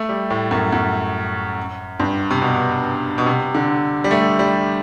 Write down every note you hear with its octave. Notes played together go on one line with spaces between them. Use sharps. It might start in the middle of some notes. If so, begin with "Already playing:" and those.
Already playing: A3
G3
A2
F#2
F#2
G2
C3
B2
B2
C3
D3
G3
A3
G3